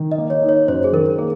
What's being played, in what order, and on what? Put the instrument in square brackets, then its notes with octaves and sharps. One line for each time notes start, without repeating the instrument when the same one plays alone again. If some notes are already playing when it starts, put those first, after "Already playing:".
Already playing: [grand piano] D#3
[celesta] D#5
[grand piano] A#3
[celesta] C#5
[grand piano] D#4
[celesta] C#5
[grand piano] F#2 [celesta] C5
[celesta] G#4
[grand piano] D#3 [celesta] A#4
[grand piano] A#3 [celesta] G#4